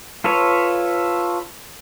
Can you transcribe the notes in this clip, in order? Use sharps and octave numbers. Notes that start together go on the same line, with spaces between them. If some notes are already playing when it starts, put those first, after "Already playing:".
F4 A4 B4 C#5